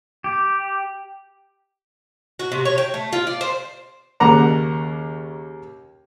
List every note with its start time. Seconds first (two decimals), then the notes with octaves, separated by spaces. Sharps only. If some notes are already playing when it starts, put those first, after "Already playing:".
0.24 G4
2.39 F#4
2.52 C3
2.65 C#5
2.78 G5
2.94 A3
3.13 F4
3.27 D5
3.41 C5
4.20 D#2 C#3 A#3 F#5 A#5 D6